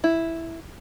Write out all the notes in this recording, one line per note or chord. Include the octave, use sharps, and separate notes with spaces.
E4